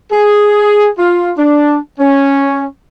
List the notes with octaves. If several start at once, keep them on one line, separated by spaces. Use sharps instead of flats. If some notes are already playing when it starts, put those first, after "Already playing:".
G#4
F4
D4
C#4